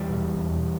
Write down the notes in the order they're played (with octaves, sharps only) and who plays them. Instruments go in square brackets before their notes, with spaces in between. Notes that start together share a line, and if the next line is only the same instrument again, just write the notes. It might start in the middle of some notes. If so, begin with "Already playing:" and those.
Already playing: [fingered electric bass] E2 E3 G3
B2
E2